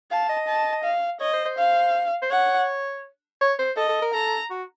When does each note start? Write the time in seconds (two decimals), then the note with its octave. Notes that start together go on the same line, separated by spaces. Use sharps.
0.11 F5 A5
0.29 D#5
0.48 A5
0.84 F5
1.20 C#5 D#5
1.33 C5
1.45 C5
1.58 F5
2.22 C5
2.30 C#5 F#5
3.41 C#5
3.59 C5
3.77 A4 D#5
3.89 A4
4.02 A#4
4.14 A4 A#5
4.50 F#4